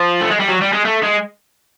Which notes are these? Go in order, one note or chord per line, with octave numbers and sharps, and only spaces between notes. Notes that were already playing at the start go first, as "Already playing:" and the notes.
Already playing: F3
A3
G#3
G3
F#3
G3
G#3
A3
G#3